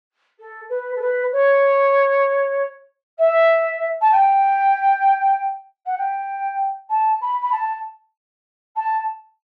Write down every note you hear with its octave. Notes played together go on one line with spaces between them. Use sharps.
A4
B4
A4
B4
C#5
E5
A5
G5
F#5
G5
A5
B5
B5
A5
A5